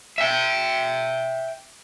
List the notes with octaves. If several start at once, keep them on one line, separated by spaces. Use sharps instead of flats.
E5 G5